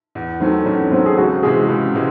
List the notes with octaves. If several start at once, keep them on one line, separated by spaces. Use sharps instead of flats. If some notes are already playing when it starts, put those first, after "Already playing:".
E2
D#3 F#3 A3 C4
E2 C#4
D#3 F#3 A3 C4
G#4
C#2 F#4
C3 E3 G#3 G#4
C#2
C3 E3 G#3